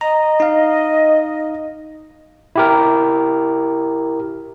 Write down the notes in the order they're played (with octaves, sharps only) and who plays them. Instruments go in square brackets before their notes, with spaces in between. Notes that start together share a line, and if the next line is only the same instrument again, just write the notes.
[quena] D#5 [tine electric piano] A#5
[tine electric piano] D#4 F5
E4 G4 A#4